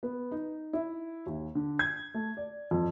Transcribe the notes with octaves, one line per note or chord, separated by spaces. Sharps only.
B3
D#4
E4
D#2
D3
G#6
A3
D5
F2